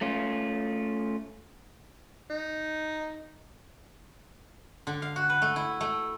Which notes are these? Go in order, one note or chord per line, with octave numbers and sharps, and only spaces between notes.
A3 C#4 F4
D#4
D3
F5
F#4
B4
A3
E4
A3